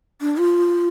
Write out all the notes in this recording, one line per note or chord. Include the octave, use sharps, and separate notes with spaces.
D4
F4